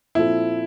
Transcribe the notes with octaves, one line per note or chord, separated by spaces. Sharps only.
A#2 F3 C4 E4 F4 A4